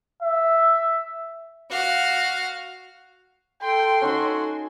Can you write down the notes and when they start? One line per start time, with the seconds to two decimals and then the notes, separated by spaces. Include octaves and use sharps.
0.23 E5
1.70 F#4 F5
3.62 A4 G5 C6
4.02 C#4 D#4 F#4 C#5